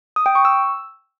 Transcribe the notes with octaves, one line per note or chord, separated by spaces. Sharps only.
D#6
G5
C#6
E6